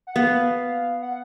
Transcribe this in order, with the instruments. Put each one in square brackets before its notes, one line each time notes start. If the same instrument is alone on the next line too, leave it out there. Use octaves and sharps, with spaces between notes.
[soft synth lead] F#5
[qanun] B3 [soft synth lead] F5
[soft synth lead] F#5